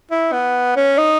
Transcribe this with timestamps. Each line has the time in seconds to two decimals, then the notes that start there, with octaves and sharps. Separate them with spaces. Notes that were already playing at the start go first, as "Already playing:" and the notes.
0.11 E4
0.33 B3
0.76 C#4
0.98 D#4